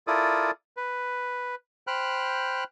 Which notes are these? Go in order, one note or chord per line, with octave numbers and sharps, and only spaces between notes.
E4 F4 A4 A#4 D5 D#6
B4
C5 G5 B5 F6 F#6